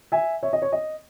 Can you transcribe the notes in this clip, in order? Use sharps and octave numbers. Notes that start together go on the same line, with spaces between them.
E5 G#5
C#5 E5
D#5
C#5
D#5